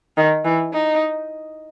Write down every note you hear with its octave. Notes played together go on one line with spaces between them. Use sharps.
D#3
E3
D#4